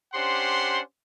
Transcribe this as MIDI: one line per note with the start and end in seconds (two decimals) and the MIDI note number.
0.14 0.80 61
0.14 0.80 62
0.14 0.80 67
0.14 0.80 72
0.14 0.80 78
0.14 0.80 84